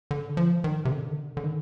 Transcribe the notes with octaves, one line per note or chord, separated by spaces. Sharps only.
D3
F3
D#3
C3
D3
D#3
D3
D3
D#3